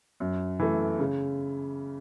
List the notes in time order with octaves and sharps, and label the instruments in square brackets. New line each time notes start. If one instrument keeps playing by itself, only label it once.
[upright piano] F#2
E3 A3
C#3